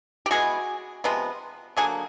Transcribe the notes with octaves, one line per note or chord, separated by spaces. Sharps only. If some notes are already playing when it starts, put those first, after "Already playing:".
G4
E3 G#3 B3 F#4 G#4
C3 F3 G#3 B3
D3 F#3 A#3 F#4 G#4